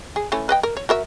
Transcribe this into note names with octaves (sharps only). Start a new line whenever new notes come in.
G#4
E3 A3 C#4
B4 D#5 G5
A#4
C#5
F#4 A#4 E5